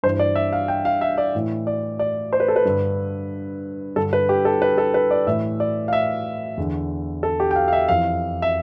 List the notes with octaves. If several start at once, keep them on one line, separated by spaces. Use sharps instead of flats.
G2 E3 C5
D5
E5
F5
G5
F5
E5
D5
A2 E3
D5
D5
C5
B4
A4
B4
G2 D3
G2 D3 A4
B4
G4
A4
B4
A4
B4
D5
A2 E3 E5
D5
F5
E5
E2 D3
A4
G4
G5
F5
F5
E5
F2 E3 F5
E5